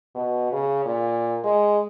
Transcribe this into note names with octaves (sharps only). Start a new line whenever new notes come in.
B2
C#3
A#2
G#3